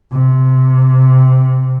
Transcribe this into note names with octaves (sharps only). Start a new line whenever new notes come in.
C3